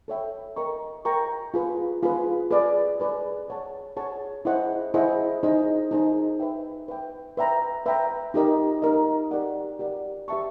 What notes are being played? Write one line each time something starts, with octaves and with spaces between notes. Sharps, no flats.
A4 C#5 E5 G5 B5
A#4 D#5 G5 A#5 C#6
A#4 D#5 G5 A#5 C#6
F4 G#4 B4
F4 G#4 B4
G#4 B4 D5
G#4 B4 D5
G#4 C#5 F#5 A5
G#4 C#5 F#5 A5
E4 G#4 C5 D#5 F#5
E4 G#4 C5 D#5 F#5
D#4 G#4 C5 D#5
D#4 G#4 C5 D#5
B4 E5 G5
B4 E5 G5
B4 E5 G5 A#5
B4 E5 G5 A#5
D#4 G4 A#4 D#5
D#4 G4 A#4 D#5
G4 A#4 D5 F#5
G4 A#4 D5 F#5
G4 B4 E5 A5 C#6